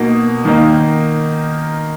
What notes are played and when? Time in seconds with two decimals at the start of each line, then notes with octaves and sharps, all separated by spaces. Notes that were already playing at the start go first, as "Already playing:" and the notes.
Already playing: B2 A#3 D#4
0.45 D#3 A#3 D#4